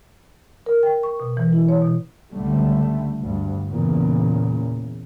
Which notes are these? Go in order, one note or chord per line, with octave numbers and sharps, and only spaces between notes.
A#4
G5
C#6
B2
E3
E4
C#5
B2
C#2 D3 G3 A3
D2 G2
E2 A#2 C#3